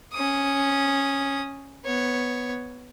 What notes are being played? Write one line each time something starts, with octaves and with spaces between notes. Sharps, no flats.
C#4 D#6
B3 C#5